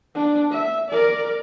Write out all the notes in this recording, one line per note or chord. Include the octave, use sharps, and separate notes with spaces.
D4
E5
A#4 D5